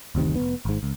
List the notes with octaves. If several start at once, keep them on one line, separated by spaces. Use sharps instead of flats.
F#1 D2 C3 D#3
F1 B3
G#1 G#2
C#2